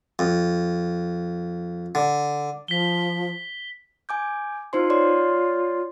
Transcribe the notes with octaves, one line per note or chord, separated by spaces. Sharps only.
F2
D3
F3 B6 G7
G#5 D6 G6
D#4 F4 C5 C6
C#5 D5 C6